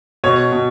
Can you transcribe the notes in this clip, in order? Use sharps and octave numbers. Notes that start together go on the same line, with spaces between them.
B2 C#5
B2